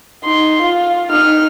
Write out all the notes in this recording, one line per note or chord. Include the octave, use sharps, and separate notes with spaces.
D#4 C6
F4
D#4 F6